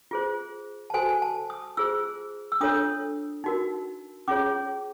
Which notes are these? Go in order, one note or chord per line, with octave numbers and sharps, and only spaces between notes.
F4 G#4 C5
A5
F#4 A4 C5 G#5
A5
D#6
F4 G#4 C5 E6
E6
D4 F4 A4 C#5 D#6
D#4 F#4 A#4
C#4 F4 G#4 C#5 D6